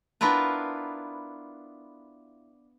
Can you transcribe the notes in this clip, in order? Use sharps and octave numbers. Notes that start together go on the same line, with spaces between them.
B3 D4 E4 F4 A#4 B4